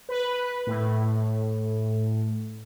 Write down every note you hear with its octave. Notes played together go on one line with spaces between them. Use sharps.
B4
A2